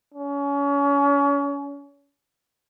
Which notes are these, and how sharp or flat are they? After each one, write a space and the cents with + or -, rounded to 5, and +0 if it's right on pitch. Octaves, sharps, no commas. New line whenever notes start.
C#4 +30